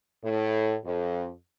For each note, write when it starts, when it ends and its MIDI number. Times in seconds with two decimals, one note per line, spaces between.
0.23 0.75 45
0.84 1.31 41